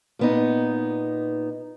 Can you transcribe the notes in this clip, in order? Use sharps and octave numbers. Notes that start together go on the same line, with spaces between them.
A#2 B3 D#4